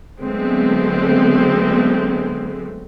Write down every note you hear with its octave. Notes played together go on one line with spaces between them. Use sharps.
D3 F#3 G#3 A3 B3 C4